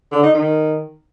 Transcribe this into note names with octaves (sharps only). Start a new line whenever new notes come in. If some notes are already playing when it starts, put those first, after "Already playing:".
D3
D#4
D#3